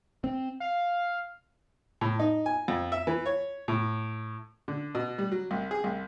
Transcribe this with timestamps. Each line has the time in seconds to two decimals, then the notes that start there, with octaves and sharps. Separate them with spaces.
0.24 C4
0.60 F5
2.01 A2
2.19 D#4
2.46 G#5
2.68 F2
2.92 E5
3.07 E3
3.26 C#5
3.68 A2
4.68 D3
4.95 B2
5.18 G3
5.32 F#3
5.51 C2
5.71 G#4
5.84 C2